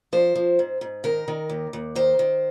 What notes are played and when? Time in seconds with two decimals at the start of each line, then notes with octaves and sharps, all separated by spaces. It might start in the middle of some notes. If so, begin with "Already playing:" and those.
0.13 F3 C5
0.35 F3
0.59 G#2
0.81 G#2
1.04 D#3 A#4
1.28 D#3
1.49 D#2
1.73 D#2
1.95 D#3 C5
2.19 D#3